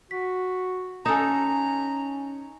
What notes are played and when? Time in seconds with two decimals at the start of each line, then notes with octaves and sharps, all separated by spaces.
0.11 F#4 B6
1.06 C#4 D#4 A4 G#5 A#5 E7